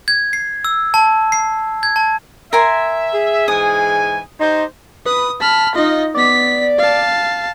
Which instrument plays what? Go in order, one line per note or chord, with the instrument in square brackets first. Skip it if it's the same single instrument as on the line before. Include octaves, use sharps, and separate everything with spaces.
[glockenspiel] G#6
C7
E6
A5
C7
G#6
A5
[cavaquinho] A#4 G#5 C6 [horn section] E5
[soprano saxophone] G#4
[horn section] G#2 E3 G#5 [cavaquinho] D#6
[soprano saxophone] D#4 [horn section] G4 C5
[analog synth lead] B4 [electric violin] D#6
[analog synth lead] A5 [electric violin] B5 F6
[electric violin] D#4 D#5 [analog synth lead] F4
[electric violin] B3 B6 [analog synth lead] D5
[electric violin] F5 A5